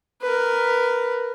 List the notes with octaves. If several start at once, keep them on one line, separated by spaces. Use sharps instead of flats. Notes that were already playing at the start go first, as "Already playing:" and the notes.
A#4 B4